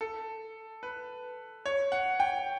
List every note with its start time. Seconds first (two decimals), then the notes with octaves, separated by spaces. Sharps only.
0.01 A4
0.83 B4
1.66 C#5
1.92 F#5
2.20 G5